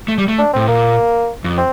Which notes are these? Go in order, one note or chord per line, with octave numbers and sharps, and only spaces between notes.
A3
G3
A3
D4
A2 C4
A#2 A#3
F2
C4